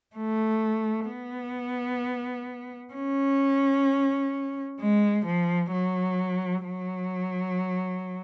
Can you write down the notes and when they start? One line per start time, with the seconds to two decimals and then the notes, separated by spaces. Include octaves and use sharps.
0.16 A3
1.09 B3
2.94 C#4
4.80 G#3
5.25 F3
5.72 F#3
6.64 F#3